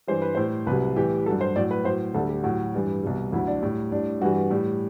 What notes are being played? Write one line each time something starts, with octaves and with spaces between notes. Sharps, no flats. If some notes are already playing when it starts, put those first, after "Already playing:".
G2 E3 G3 C5
B4
A2 G3 C5
C2 C3 F#3 B4
A2 E3 G3 G4
G2 F#3 A4
C5
A2 F#3 D5
B4
A2 F#3 C5
D2 D3 G3 A4
G4
A2 F#3 F#4
G2 E3 G3
C2 B2 G3
D2 D3 F#3 E4
D4
A2 G3
A2 G3 D4
G2 E3 G3 F#4
A2 G3